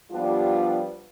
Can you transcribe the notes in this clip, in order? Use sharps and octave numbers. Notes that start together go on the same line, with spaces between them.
F3 G3 B3 D4 F4 G4